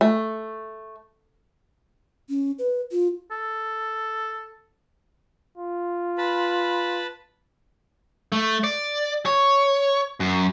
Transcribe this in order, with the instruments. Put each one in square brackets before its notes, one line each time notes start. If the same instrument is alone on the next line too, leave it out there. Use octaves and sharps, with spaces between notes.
[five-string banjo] A3
[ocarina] C#4
B4
F4
[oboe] A4
[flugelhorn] F4
[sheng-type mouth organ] B4 A5 B5
[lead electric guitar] A3
D5
C#5
F#2